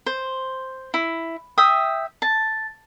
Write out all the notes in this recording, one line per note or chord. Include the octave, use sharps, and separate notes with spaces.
C5
E4
E5 G5 D#6
A5